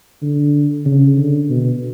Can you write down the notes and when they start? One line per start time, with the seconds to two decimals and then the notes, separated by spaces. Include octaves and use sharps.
0.22 D3
0.85 C#3
1.18 D3
1.49 B2